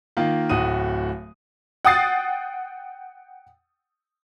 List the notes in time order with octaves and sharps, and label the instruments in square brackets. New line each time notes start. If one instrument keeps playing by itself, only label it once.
[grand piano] D#3 A#3 F4
D1 A2 F#4 D#6 D#7
[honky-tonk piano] F#5 G5 D#6 A6 C7